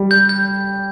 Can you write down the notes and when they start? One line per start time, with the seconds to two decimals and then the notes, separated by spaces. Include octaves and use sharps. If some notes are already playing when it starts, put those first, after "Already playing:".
Already playing: G3
0.11 G6
0.29 G6